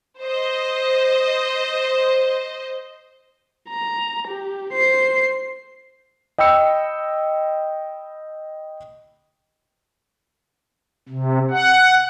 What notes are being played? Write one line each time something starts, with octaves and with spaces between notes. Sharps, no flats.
C5 D#5
A#5
G4
C5 C7
D#5 G5 B5 E6 C#7
C3
F#5